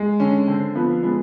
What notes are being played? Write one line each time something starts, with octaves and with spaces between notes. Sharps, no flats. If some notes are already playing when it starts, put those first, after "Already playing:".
Already playing: G#3
D3 C#4
D3 C4
F3 B3
G#3 B3